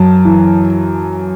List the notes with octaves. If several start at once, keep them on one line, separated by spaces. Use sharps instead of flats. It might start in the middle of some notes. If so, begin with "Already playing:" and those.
Already playing: F#2 A5
E3